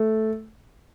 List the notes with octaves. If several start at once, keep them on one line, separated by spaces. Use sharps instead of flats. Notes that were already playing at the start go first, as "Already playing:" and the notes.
Already playing: A3